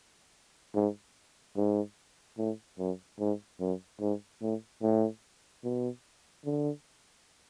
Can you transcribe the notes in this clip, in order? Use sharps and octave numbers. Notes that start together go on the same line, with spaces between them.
G#2
G#2
A2
F#2
G#2
F#2
G#2
A2
A2
B2
D3